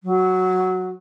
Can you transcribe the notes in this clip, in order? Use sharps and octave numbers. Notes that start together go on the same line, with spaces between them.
F#3